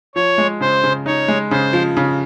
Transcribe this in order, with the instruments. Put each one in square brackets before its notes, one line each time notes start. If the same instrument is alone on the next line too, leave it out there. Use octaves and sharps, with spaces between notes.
[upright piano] F3 [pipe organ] C#5
[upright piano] G#3
[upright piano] C#3 [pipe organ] C5
[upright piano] C#3
[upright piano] D#4 [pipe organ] C#5
[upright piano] G#3
[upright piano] C#3 [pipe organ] C5
[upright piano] F3
C#3